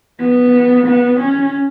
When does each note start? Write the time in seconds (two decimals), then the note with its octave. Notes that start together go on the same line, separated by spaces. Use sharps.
0.20 B3
0.87 B3
1.21 C#4